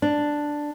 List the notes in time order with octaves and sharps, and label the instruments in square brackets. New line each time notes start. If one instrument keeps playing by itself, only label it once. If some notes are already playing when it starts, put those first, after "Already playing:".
[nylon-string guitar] D4